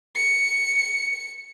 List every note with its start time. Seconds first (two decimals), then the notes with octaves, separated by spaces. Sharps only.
0.16 C#7